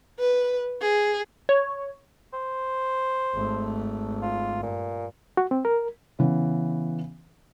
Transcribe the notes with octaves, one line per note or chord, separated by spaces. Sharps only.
B4
G#4
C#5
C5
G#1 A3
F4
G2 A#2
F#4
C4
A#4
C#3 E3 B3